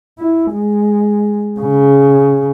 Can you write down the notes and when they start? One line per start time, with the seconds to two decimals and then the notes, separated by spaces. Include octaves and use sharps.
0.19 E4
0.53 G#3
1.60 C#3